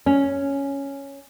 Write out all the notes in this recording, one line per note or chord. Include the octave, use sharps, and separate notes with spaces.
C#4